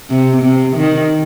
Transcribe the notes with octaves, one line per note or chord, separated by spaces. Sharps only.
C3
C3
D#3